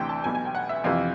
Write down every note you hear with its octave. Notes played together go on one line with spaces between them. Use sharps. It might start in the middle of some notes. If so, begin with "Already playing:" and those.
Already playing: D2 C3 E3 G5
A5
B1 B2 G#5
G#5
G5
F#5
E5
F2 C3 E3 F5